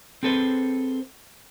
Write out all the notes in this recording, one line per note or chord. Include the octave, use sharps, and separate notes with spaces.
C4 G#4 A4 B4 C5